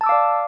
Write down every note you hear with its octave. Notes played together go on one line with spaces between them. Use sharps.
D5 F5 A5 D6 E6